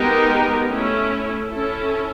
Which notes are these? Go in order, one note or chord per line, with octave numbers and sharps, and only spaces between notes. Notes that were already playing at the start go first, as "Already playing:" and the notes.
Already playing: G#3 B3 D#4 G4 A#4
A3 C#4 E4
C#4 E4 A4